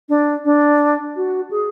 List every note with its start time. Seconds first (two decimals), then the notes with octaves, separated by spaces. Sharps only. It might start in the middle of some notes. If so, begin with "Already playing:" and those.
0.09 D4
0.45 D4
1.16 F#4
1.51 G#4